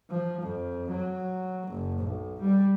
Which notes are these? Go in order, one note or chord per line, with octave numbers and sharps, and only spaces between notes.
F3
F2
F#3
F#1
B1
G3